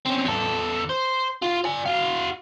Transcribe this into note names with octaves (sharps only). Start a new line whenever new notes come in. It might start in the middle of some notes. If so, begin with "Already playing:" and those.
C4 C#4
E2 A4
C5
F4
D5 G#5
F#4 F5